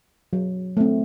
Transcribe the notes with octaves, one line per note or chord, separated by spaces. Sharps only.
F#3
A3 C4